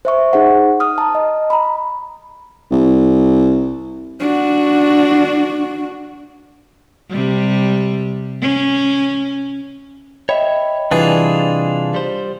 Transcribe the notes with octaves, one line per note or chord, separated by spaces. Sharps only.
C5 E5 C#6
D#4 G#4 C5 F#5
D#6 F6
A5 A#5
D#5
A#5 B5
C2
D4 F#4
C3 G3
C#4
C#5 D#5 E5 G5 B5
C3 E3 G3 D4 F4 G#4
G3 C5